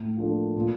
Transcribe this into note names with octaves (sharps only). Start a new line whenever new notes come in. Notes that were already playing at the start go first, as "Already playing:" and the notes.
Already playing: A2
F3 A#3 D4 A4
A#2